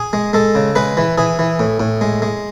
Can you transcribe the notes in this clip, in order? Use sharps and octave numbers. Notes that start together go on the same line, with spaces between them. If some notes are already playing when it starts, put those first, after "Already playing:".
Already playing: G#4
G#3
G#3 A4
C#3
G#3 B4
E3
E3 G#4
E3
A2
A2
G#3
G#3